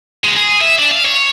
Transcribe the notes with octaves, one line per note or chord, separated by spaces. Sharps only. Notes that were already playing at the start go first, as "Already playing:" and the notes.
C#2 G#3
G#4
E5
D4
F5
C#5